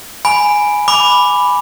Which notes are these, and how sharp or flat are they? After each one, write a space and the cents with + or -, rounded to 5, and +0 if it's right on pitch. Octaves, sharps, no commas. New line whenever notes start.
G#5 +0 B5 -5
B5 +0 D6 +0